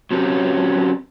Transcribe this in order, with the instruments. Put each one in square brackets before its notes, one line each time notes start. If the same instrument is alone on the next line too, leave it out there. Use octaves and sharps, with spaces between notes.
[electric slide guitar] F#3 C4 C#4 G4